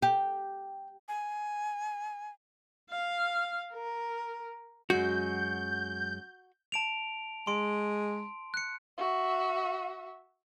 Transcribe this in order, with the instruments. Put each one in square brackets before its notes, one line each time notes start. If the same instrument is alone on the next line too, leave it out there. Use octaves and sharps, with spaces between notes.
[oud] G4
[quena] G#5
[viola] F5
A#4
[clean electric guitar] F#2 F#3 G#3 [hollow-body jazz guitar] F#4 [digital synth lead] G6
[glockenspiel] A5 D7 F7
[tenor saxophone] G#3 [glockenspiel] C6 D7
[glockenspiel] F#6 C#7
[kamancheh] F#4 E5